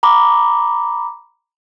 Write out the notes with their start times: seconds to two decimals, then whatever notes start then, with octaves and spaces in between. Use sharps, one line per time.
0.03 A#5 B5 D6